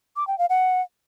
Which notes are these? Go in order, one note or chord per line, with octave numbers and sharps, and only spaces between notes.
D6
G5
F5
F#5